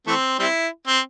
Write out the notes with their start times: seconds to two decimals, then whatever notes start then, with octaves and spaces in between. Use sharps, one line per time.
0.07 E3 A3 C4
0.39 G3 C4 E4
0.87 C4